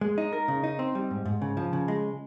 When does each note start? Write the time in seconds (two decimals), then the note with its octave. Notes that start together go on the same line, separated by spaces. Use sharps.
0.01 G#3
0.18 D#4
0.33 A#4
0.48 C#3
0.64 D#4
0.79 C4
0.95 G3
1.11 G#2
1.26 G#2
1.42 C#3
1.57 F3
1.73 C#3
1.88 G#3